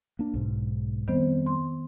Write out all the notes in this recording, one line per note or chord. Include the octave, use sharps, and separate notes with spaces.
A#3 D4
B1 G#2
F2 D#3 G3 B3 C4 C5
C6